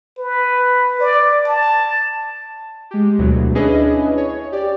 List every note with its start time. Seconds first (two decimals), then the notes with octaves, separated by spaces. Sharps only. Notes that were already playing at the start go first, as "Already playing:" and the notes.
0.18 B4
1.01 D5
1.46 A5
2.91 G#3 G4
3.19 D2 B2 E3 F#3
3.55 C#4 D4 E4 G#4 B4 D#5
4.17 C#5
4.52 G4 D5